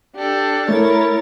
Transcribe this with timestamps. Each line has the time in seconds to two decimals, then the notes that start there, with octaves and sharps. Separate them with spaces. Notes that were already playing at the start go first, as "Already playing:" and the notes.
0.15 D4 G4 A4
0.69 A3 E4 A#4 C#5 A6